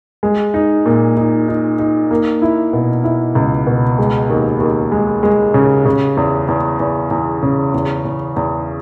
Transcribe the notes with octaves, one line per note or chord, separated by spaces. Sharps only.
G#3
D#4
A#2
D#4
D#4
D#4
A#3
E4
B2
E4
C#2
B2
G#3
D#2
D#2
G#3
G#3
C#3
C#3
E2
E2
E2
E2
C#3
E2
E2
E2